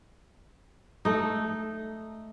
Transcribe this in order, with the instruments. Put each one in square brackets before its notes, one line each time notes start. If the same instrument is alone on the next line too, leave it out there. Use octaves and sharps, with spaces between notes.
[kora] A3 D#4